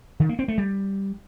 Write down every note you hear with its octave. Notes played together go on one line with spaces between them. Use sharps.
D#3
A#3
C4
A3
G3